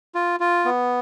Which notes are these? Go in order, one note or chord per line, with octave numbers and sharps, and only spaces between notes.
F4
F4
B3